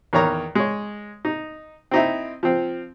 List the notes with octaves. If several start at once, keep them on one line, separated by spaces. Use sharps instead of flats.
E2 D#3 C#5 A#5
G#3 C#5
D#4
C4 D#4 E4
F3 C4